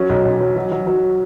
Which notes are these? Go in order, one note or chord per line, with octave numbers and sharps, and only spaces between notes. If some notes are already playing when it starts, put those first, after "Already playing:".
Already playing: F#3 C#4
B1
B1
F#3
F#3
F#3
F#3